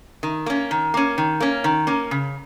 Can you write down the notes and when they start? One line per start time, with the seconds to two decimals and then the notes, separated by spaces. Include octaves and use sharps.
0.23 D#3
0.46 A#3 C#4
0.71 D#3
0.94 A#3 C#4
1.18 D#3
1.40 A#3 C#4
1.64 D#3
1.87 A#3 C#4
2.11 C#3